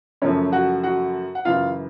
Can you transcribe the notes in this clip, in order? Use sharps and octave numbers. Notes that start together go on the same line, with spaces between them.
F#2 C#3 F3 A3 C#4 C#5
F#4 F#5
F#4 F#5
F#5
F#2 C#3 E3 F4 F5